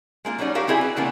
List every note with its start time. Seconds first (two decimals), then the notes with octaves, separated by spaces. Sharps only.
0.25 G#3 A#3 D#4 F4
0.38 F#3 G3 C#4 D#4 D5
0.55 F#4 G4 A#4 F5
0.67 G3 C4 E4 G#4 E5 G#5
0.81 B4
0.96 C#3 E3 G3 A#3 B3 D4